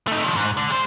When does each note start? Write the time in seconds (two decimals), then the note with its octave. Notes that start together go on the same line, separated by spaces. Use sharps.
0.07 A3 D#4
0.24 D#3 F3
0.36 G#2
0.57 D3
0.70 G#3 C5